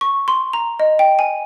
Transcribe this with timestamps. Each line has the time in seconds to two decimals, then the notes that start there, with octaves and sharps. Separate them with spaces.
0.01 C#6
0.28 C6
0.53 A#5
0.80 D#5
0.99 G5
1.19 G#5